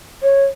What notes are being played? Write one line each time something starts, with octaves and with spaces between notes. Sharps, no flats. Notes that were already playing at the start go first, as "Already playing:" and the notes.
C#5